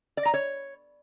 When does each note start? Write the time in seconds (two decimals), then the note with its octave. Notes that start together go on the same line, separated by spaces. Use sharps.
0.17 D5
0.25 A#5
0.34 C#5